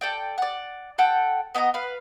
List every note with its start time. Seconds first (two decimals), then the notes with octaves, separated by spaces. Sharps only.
0.01 A4 D5 G5
0.38 D5 F#5
0.98 A4 F#5 G5
1.55 B3 D#5 G5 A#5
1.74 B4 F5